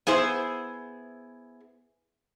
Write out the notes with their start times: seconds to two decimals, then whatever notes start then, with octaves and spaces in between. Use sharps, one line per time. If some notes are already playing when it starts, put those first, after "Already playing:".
0.07 B3 E4 G#4 C5 E5